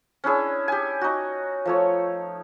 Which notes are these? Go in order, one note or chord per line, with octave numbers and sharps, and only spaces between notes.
C#4 D4 E4 G#4
G4 G#5
D#4 F#4
F3 A3 C#5